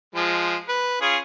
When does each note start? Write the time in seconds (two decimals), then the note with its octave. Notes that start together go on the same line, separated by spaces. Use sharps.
0.15 F3 G#3
0.69 B4
1.01 C#4 F4 G#4